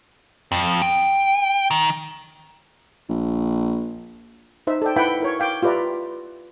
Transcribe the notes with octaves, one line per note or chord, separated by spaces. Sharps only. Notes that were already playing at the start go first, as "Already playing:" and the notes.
F2
G5
D#3
A#1
D#4 C5 E5
A4 D5 G5
E4 B4 E5 F#5 G5 B5
E4 A#4 C#5
F5 G5 D6
F4 G4 B4 D5 E5 A#5